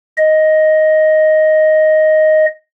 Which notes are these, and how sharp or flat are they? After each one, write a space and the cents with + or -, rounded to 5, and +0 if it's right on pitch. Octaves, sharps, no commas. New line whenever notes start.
D#5 +5